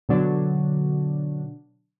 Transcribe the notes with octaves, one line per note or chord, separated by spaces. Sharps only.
B2 D3 F#3 D4